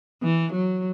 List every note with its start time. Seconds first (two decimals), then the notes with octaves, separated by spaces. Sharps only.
0.22 E3
0.53 F#3